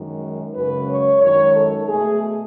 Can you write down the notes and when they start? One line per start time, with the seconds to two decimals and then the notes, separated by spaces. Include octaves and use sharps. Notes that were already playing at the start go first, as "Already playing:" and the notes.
Already playing: F#2 D#3 G#3
0.54 F#2 C#3 G#3 B4
0.88 C#5
1.21 F#2 D#3 G#3 C#5
1.55 A4
1.88 B2 A3 G#4